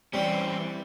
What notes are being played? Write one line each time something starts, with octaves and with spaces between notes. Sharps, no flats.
E3 G3 C4 C#4